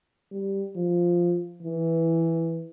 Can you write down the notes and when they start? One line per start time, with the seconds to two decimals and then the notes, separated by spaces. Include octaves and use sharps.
0.32 G3
0.75 F3
1.62 E3